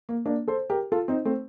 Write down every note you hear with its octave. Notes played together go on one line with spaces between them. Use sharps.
A#3
A#3 D4
A4 C5
G4 A#4
F4 A4
C4 D#4
A3 C4